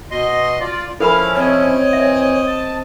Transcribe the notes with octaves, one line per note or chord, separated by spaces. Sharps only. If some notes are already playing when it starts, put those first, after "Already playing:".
B2 D#5 C6
F4 D5
F3 C#4 E4 A4 A#4 F5 B5
C4 C#5 D#5
E3 E5
A5